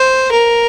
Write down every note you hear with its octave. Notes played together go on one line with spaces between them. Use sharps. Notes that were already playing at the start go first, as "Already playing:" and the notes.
Already playing: C5
A#4